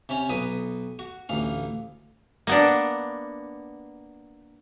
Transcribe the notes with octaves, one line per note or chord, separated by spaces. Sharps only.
C3 C#4
B1 B4 D#6
F#4
A1 D2 F5
A#3 B3 D4